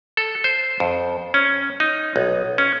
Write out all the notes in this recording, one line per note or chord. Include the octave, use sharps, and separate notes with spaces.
A4
C5
F2
C#4
D#4
B1
C#4